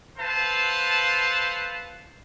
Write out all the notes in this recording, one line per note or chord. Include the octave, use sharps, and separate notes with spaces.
A4 B4 C5 F5 F#5 A5